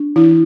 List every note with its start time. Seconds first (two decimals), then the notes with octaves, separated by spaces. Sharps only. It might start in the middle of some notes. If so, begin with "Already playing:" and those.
Already playing: D4
0.16 E3 E4